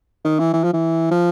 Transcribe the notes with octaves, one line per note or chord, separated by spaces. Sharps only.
D#3
E3
E3
F3
E3
F3